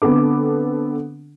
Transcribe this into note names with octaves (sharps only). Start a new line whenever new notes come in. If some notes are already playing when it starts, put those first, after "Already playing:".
D3 B3 C4 A4 D6